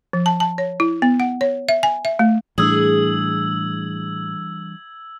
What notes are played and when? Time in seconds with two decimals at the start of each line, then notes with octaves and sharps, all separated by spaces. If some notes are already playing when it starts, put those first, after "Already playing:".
0.13 F3
0.26 A5
0.40 A5
0.58 C#5
0.80 E4
1.02 B3
1.20 F#5
1.41 C#5
1.69 E5
1.83 G#5
2.05 E5
2.19 A3
2.58 A2 E3 G3 D4 G#4 E6 G#6 F#7